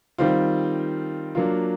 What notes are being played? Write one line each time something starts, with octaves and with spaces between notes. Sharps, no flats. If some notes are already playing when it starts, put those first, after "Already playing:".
D#3 G3 C4 F4
F#3 A#3 D4 F4